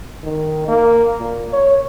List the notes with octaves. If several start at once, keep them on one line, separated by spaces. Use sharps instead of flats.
D#3
A#3
A#2
C#5